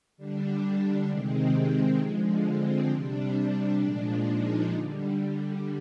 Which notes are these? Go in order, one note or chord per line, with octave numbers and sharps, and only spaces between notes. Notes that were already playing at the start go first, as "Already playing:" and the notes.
D3 G3 D4
C3 D#3 G#3 C4
D3 F3 G#3
C4
C3 G3 D4
D4
A#2 F3 G#3 D4
D#4
D3 G3